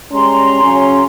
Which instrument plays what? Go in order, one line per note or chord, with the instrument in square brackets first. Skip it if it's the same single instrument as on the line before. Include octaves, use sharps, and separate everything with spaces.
[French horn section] G3 G#3 C#4 [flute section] A#5 C6
[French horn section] C#3 F#3 C#4